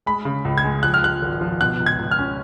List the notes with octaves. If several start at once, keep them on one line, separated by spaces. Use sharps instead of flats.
G#3 B5
C#3
C#2
G#6
G#3
F3 F#6
F6
F3 F#6
G#1
F3
B2 F#6
C#2
G#6
C#2
F6
C#4